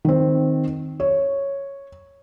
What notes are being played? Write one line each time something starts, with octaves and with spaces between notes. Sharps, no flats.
D#3 C4
C#5